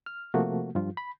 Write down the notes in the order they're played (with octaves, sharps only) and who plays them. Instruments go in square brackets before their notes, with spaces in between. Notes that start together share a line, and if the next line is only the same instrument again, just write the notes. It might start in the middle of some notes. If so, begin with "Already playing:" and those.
[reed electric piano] F6
C3 F3 A3 A#3 F#4
G2 F3 F4
B5